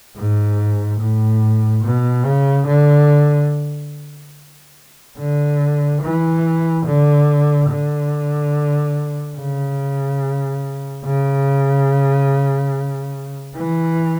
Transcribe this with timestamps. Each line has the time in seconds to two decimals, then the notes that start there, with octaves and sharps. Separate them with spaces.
0.16 G#2
1.00 A2
1.84 B2
2.25 C#3
2.67 D3
5.18 D3
6.02 E3
6.86 D3
7.69 D3
9.37 C#3
11.05 C#3
13.56 E3